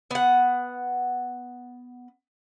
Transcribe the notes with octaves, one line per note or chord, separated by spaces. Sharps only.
B3 F#5